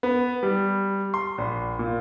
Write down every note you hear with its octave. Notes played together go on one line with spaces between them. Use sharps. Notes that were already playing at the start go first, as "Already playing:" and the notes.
B3
G3
C6
A#1
A#2